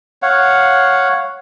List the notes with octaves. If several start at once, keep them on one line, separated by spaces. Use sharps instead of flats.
C#5 F5 F#5